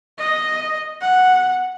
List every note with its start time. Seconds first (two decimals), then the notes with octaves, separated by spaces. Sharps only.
0.18 D#5
1.01 F#5